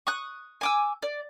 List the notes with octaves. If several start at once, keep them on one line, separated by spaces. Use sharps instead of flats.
C#6 D#6 F#6
G#5 D6 E6
D5